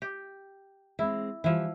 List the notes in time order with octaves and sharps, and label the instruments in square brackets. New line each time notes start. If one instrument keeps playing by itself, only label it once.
[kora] G4
[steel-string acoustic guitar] G#3 C4 [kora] E4
[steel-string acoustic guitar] E3 G3 [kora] F3 E4